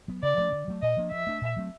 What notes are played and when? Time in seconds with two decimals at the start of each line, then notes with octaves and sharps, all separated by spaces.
0.08 F#3 B3
0.22 C#3 D5
0.37 F3 A3 C#4
0.52 D3
0.68 F#3 A3
0.82 A#2 D#5
0.96 F3 A#3 D4
1.11 F3 E5
1.27 A3 D4
1.41 A#2
1.56 F#3 A3 C4